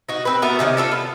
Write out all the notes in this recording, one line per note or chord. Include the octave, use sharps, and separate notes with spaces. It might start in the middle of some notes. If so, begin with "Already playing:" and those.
D#4 F#4
C4 B4
A3 B3 F#4 A#4
C3 D#3 A3 C#4
D4 F4 A4 D5
B3